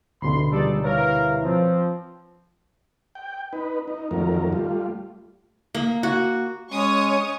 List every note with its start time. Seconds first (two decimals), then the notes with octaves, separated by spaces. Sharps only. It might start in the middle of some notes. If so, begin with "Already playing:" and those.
0.22 D2 B2 D3 B5 C6
0.52 C#2 E3 G3 D#4 A4 D5
0.84 G3 E4 A#4 B4 C#5 F5
1.42 F3 C4
3.15 G5
3.53 D#4 B4
3.88 D#4
4.11 F2 D#3 F#3 A3 A#4
4.53 G3 A3 F4
5.75 A#3
6.03 F#4
6.71 G#3 C#4 C#5 C#6 D#6